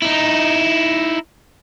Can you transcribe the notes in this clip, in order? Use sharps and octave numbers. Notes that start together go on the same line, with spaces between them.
D#4 E4